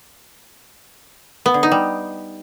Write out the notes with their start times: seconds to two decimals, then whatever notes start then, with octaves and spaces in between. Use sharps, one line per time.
1.46 B3
1.54 D3
1.63 D#4
1.72 G3